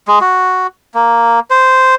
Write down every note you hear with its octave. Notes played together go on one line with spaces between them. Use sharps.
G#3
F#4
A#3
C5